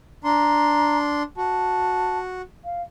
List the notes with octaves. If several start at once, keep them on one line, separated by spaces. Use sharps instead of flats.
D4 A#5 C6
F#4 A5
F5